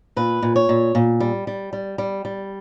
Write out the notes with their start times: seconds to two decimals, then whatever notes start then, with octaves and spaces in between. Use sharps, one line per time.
0.16 A#2 B4
0.43 A#2
0.56 C#5
0.69 A#2
0.95 A#2
1.20 G3
1.47 G3
1.73 G3
1.98 G3
2.25 G3